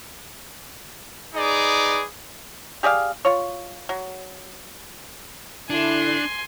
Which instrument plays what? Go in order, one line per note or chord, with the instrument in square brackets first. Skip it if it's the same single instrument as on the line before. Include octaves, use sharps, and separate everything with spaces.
[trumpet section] D#4 G#4 B4 D5
[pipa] G4 G#4 D5 F5
F4 C#5
F#3
[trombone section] D3 E4 [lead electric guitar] D4 [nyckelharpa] G#5 C6